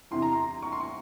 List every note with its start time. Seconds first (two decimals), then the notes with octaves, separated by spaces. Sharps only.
0.11 E2 C3 E3 C6
0.22 A#5
0.33 C6
0.62 C#6
0.72 C6
0.80 C#6